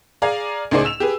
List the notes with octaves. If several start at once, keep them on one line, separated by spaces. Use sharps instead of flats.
G#4 D5 F5 G#5 A#5
C#2 A2 D#4 G#4 C5 D5
E6 E7 F7
G4 G#4 B4